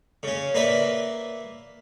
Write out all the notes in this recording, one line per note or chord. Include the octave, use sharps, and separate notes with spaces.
C#3 C#4
A#3 B4 D5 E5